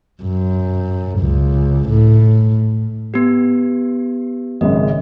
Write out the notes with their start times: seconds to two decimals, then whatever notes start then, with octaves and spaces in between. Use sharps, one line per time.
0.23 F#2
1.19 C#2
1.89 A2
3.14 B3 G4
4.61 G#1 F#2 C#3 D#5